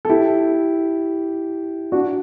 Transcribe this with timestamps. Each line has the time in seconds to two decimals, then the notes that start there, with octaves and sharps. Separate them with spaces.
0.05 A4
0.09 E4 G4
1.92 D4 F#4